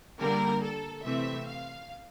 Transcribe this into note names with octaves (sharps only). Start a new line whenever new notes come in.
D3 G3 A#3 A#4
A4
C3 E3 A3 C4 E5
F5